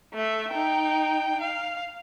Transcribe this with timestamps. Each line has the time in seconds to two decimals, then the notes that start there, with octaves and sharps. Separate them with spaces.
0.14 A3 E5
0.51 D#4 G5
1.41 F5